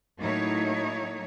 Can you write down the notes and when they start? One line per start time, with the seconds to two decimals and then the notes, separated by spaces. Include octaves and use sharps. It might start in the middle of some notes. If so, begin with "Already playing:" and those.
0.19 A2 F#3 A#3 D#4 E4 C#5